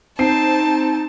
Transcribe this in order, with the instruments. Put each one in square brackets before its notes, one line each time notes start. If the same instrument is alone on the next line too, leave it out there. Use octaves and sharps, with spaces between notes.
[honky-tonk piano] C4 C7 [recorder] D#4 [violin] A5